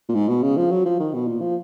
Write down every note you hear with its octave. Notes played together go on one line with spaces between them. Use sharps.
A#2
G#2
B2
C#3
F3
F#3
F3
D#3
B2
A#2
F3